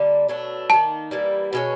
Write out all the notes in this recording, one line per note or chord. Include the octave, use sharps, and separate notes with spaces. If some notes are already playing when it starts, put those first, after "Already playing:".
Already playing: D3 G3 A#3
B2 F#3 A3 D4
D#3 G3 A#3 D#4 A5
E3 G3 A#3
B2 G#3 C#4